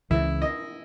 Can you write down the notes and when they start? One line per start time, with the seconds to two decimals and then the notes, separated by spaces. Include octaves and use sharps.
0.10 C#2 C#3 E3 E4
0.42 D#5